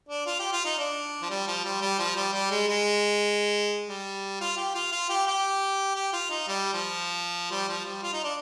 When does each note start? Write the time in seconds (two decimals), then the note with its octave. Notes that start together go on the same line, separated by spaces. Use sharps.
0.09 D4
0.26 F4
0.39 G4
0.52 F4
0.65 D#4
0.78 D4
1.22 F3
1.30 G3
1.47 F3
1.64 G3
1.82 G3
1.99 F3
2.16 G3
2.33 G3
2.51 G#3
2.68 G#3
3.89 G3
4.41 F4
4.57 G4
4.75 F4
4.92 F4
5.09 G4
5.27 G4
5.95 G4
6.13 F4
6.30 D#4
6.48 G3
6.74 F3
7.51 G3
7.68 F3
7.85 G3
8.03 F4
8.13 D#4
8.24 D4